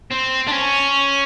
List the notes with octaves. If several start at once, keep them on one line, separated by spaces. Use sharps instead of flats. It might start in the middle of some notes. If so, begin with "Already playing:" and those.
C4
D4
C#4